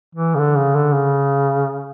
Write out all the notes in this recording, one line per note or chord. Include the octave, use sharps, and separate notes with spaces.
E3
C#3
D3
C#3
D3
C#3